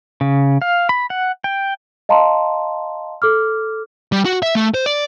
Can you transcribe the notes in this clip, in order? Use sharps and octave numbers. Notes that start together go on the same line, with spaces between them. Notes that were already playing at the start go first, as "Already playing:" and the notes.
C#3
F5
B5
F#5
G5
D#5 F5 A5 A#5 C6
A4 D6 F6
G3
F#4
E5
A3
C5
D5